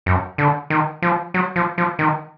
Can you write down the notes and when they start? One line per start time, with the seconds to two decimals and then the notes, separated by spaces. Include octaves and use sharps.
0.06 F#2
0.38 D3
0.70 D#3
1.02 F3
1.34 F#3
1.56 F3
1.78 F3
1.99 D#3